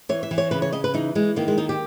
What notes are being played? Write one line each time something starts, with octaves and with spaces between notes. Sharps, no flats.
E3 C#5
E5
E3
C#5
C#3 B4
C#5
C#3 D#5
B4
E3 D#4
E3 G#3
D#3 A#3
G#3
D#2 D#4
G4